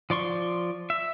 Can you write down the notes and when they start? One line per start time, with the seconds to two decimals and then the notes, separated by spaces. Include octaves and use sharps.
0.10 F3 D5 C6 C#6
0.90 E5